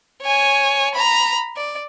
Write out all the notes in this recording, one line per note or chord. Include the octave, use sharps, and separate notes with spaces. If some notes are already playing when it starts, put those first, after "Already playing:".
C#5 G#5
A#5 B5
D5